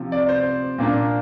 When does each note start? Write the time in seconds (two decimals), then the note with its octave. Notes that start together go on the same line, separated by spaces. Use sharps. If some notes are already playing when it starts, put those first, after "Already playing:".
Already playing: C3 F3 C4
0.12 D5
0.29 C5
0.78 A#2 A#3 D4